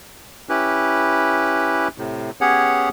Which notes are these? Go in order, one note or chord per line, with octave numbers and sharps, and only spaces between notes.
C#4 E4 G4 B4
A2 C3
B3 C#4 G4 G#4 C#5 F#5